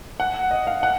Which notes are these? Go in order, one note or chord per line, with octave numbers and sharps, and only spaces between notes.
F#5
D#5
F5
F#5